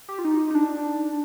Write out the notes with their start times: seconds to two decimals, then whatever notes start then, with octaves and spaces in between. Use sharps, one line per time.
0.09 G4
0.19 F4
0.25 D#4
0.50 D#4
0.55 D4